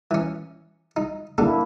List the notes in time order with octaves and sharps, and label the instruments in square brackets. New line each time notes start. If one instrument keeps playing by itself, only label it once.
[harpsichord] E3 C#4
D#4
[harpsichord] D3 A4 [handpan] A#3 D4 E4